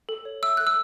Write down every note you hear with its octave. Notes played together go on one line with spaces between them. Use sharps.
A4
C#5
E5 E6
A4 F#6
E6